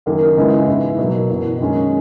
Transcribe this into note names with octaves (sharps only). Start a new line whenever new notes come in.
F#1 F#2 D#3 A#3
C#2 C#3 G#3 B3 E4
G#2 E3 B3 E4
B2 F#3 A#3
F#1 E2 B2
F#2 D#3 G#3 C#4 G#4